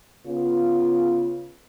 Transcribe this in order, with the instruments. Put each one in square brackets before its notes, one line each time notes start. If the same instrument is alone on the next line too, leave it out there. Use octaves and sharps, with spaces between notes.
[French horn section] C#3 B3 F4